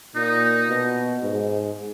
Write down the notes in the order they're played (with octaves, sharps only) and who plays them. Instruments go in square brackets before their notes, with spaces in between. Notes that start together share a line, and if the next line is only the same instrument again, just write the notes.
[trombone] A#2 [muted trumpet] D#4
[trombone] B2
G#2